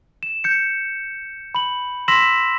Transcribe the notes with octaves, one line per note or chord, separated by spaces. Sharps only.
E7
G6 C#7
B5 F#7
C6 E6 A#6 B6 E7 F#7